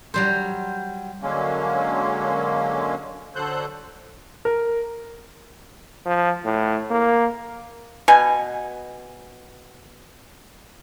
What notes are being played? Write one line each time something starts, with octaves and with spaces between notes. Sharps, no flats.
F#3 G3 C5
D3 F#3 G#3 A#3 C#4
D3 F#3 A4 C5 F#6 G6
A#4
F3
A2
A#3
B2 G#5